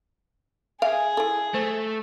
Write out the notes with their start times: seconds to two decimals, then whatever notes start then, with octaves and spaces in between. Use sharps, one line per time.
0.82 G#4 E5 F5 G#5
1.17 E4 A4
1.54 A3 C5